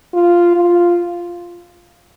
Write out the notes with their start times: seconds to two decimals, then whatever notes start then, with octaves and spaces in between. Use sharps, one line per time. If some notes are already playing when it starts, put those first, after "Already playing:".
0.14 F4
0.56 F4